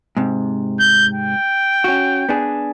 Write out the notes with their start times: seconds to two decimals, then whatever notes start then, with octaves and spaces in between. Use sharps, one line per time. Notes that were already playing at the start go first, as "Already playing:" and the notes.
0.17 G#2 C3
0.79 G6
1.14 G5
1.84 C#4 F#4
2.29 B3 D4 G#4